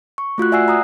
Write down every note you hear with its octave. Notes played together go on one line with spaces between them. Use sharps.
C#6
A3 F4 F#4 F#6
D5 E5 F#5 G#5 E6 C7
A#5 D#6 F#6